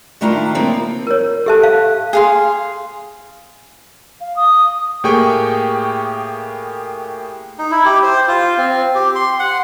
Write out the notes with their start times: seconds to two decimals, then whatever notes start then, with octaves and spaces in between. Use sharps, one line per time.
0.21 D#3 A3 D4 E4 F4 A#5
0.55 C#3 F3 A#3 C4
1.07 A#4 C#5
1.46 G4 A4 E5 A5 F#6
1.64 F5
2.13 G#4 F5 C6
4.21 F5
4.36 D#6
5.04 A2 A#3 G4 G#4 G5 C#6
7.59 D#4
7.71 E4
7.86 G4
8.03 C5
8.28 F4
8.58 C4
8.95 G4
9.15 C6
9.39 F#5